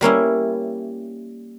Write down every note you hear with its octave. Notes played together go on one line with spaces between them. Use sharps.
G3 A#3 C#4 E4